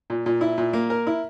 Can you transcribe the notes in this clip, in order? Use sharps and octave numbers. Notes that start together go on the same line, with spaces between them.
A#2
A#2
E4
A#2
A#3
A#4
E4